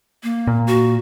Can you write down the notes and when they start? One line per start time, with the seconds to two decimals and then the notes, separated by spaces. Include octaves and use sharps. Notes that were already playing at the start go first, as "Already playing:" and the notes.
0.23 A#3
0.47 A#2
0.67 F#4